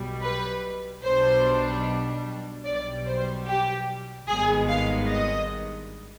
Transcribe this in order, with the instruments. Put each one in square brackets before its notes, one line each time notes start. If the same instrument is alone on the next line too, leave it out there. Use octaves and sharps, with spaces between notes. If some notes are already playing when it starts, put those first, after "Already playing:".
Already playing: [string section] B1 B2 G3
B4
B1 B2 G3 D4 C5
B1 B2 G3 D5
C5
G4
G#1 G2 D#3 G#3 B3 G#4
F5
D#5